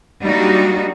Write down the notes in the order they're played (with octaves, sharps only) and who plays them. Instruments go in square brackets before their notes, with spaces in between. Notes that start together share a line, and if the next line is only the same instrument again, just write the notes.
[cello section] F#3 G3 A#3 D4 D#4 F#4